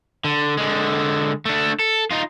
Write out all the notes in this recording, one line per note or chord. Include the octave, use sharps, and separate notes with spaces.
D3
D3 G#3
A3 D4
A4
D#4 F4